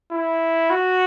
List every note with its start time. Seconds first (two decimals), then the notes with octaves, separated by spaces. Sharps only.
0.12 E4
0.70 F#4